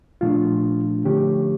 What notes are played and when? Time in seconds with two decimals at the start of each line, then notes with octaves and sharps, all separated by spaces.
0.21 A#2 F3 A3 D4 F4
1.04 D3 F3 A3 C#4 G4